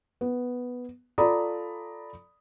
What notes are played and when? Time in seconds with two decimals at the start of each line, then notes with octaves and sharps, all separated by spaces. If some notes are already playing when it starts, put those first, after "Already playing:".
0.21 B3
1.18 F4 A4 D5 A#5 B5 D#6